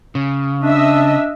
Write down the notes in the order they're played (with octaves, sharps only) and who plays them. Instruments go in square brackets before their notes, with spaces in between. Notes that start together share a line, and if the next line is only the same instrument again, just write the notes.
[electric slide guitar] C#3
[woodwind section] D4 [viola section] D#5 E5